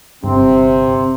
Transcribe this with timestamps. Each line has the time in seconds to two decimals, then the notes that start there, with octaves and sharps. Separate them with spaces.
0.24 G1 C3 C4